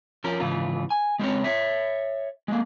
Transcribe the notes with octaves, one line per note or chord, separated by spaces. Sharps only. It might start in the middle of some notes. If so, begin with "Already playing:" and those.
F3 C#4 A#4
G#2 C#3 E3 F4
G#5
G#3 C4 C#4 C#5
C#5 E5
G#3 A#3